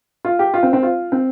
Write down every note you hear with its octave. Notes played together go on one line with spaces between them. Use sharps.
F4
G4
F4
C4
C4
F4
C4